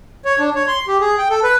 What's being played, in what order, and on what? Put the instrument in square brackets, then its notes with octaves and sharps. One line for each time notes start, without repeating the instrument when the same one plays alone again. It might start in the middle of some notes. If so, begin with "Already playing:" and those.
[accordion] C#5
D4
C#5
C6
G4
G#4
G5
A4
B4